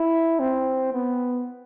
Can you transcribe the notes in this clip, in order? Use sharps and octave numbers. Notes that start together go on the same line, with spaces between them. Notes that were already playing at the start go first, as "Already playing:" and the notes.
Already playing: E4
C4
B3